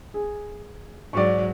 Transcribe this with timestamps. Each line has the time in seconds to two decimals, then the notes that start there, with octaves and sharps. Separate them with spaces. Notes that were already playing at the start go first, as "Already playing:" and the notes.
0.14 G#4
1.13 G#2 F#3 D5 C#6